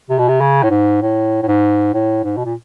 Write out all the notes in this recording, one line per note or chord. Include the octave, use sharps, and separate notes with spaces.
C3
B2
C3
C#3
A2
G#2
A2
A2
G#2
A2
G#2
B2
A#2